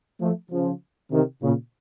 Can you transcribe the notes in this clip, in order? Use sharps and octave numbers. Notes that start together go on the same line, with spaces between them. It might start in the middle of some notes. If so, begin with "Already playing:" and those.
F3 A3
C#3 F3
C3 D#3
A#2 C#3